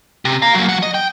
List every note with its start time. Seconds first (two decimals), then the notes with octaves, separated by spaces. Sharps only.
0.25 C3
0.42 F5 A#5
0.55 F#3 A#3
0.68 F#3 F#5
0.83 D#5
0.94 G5